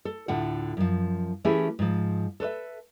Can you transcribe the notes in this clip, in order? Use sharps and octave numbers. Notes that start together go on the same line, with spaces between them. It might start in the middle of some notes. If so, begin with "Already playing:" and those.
A4
D2 A2 D3 F4 F#5
F#2 F3
E3 A3 C#4 E4 G4 G#4
G#2 F3
A4 B4 C#5 E5